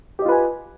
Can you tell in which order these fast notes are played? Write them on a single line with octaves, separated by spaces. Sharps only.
G4 D#5 F4 B4 G#5